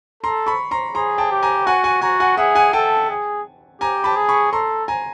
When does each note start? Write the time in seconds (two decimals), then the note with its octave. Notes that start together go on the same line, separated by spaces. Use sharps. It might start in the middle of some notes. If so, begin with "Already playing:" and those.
0.23 A4 A#5 C6
0.46 B5 C#6
0.71 A#5 C6
0.95 G#4 A#5 C6
1.18 G5 A5
1.31 G4
1.43 G#5 A#5
1.66 F#4 F#5 G#5
1.84 F#5 G#5
2.02 F#4 G#5 A#5
2.20 F#5 G#5
2.37 G#4 E5 F#5
2.55 F#5 G#5
2.73 A4 G5 A5
3.10 G#4
3.81 G4 G#5 A#5
4.04 A5 B5
4.16 G#4
4.29 B5 C#6
4.52 A4 A#5 C6
4.88 G#5 A#5